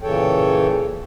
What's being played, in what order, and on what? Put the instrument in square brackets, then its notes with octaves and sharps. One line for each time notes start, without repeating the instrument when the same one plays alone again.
[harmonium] A#2 C#3 E3 A4 C#5 G5